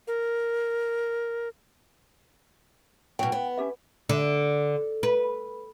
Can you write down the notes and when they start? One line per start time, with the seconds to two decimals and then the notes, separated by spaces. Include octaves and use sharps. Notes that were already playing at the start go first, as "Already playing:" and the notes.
0.07 A#4
3.19 B2 F#3 G5
3.32 B3
3.58 C#4 G4 E5
4.09 D3
5.03 B4